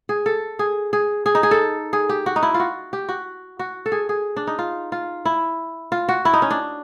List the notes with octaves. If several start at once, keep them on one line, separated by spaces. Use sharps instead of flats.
G#4
A4
G#4
G#4
G#4
D#4
G#4
A4
G#4
G4
F#4
D#4
E4
F4
F#4
G4
F#4
F#4
A4
G#4
G#4
D4
D#4
F4
F4
E4
F4
F#4
E4
D#4
C#4
D4